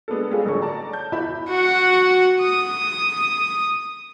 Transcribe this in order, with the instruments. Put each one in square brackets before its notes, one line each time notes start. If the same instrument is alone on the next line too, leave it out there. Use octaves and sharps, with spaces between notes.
[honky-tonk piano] G#3 B3 D4 A4
G3 G#3 C#4 F4 G#4 A4
A1 D3 F#3 C#4 A4 C#6
D5 A5 A#5
A5 G6
E2 E4 B5
[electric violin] F#4 F#5
D#6